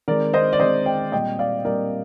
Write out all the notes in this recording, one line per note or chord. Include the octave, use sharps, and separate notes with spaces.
D#3 G#3 C4 A#4 D5
C5 D#5
D5
D#3 G#3 C4 C5 D#5
D#5 G5
A#2 G3 C4 D#5 G5
D5 F5
A#2 G3 C4 A#4 D5